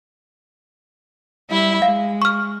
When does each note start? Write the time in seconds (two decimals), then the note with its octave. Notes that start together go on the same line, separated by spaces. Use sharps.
1.50 G3 E4 E5
1.82 G#3 F5
2.22 C#6 F6